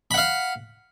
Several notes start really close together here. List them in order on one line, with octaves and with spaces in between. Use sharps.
B5 F#5 F5